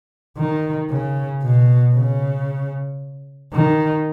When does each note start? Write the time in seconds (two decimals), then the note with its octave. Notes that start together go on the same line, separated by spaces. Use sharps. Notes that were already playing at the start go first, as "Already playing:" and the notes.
0.37 D#3
0.90 C#3
1.43 B2
1.95 C#3
3.53 D#3